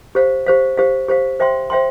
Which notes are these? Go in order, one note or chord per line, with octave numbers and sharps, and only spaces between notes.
G4 C5 F5
G4 C5 F5
G4 C5 F5
G4 C5 F5
C5 E5 G5 C6
C5 E5 G5 C6